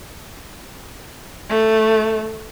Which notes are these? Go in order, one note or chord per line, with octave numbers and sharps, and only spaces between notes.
A3